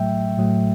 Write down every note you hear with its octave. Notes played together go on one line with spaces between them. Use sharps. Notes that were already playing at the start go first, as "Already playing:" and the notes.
Already playing: A2 F#3 A3 E5 G5
A2 F#3 A3